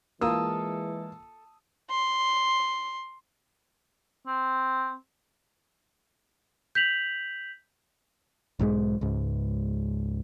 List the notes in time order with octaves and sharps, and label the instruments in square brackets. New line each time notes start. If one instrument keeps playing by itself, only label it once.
[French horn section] E3 G#3 [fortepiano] A#3 F4 [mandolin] A4 [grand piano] D#6 E6
[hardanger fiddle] C6
[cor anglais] C4
[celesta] G6 B6 F7 F#7
[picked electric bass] B1 G#2 D#3 G#3
C#2 G#2